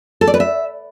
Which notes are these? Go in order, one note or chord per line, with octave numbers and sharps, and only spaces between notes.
A4
D5
B4
E5